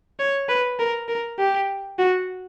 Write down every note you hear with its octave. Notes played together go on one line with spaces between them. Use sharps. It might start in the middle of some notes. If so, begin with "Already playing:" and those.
C#5
B4
A#4
A#4
G4
F#4